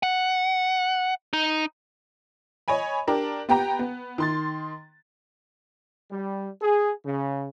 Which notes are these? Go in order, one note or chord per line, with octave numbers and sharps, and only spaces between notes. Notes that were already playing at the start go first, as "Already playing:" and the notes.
F#5
D#4
C#5 D#5 G#5 B5
D4 G4 A#4
B3 G4 G5 A#5
B3
D#3 C6 A6
G3
G#4
C#3